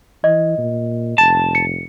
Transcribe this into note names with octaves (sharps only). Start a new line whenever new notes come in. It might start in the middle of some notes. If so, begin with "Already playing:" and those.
E3 D#5
A#2
F1 A5
C#7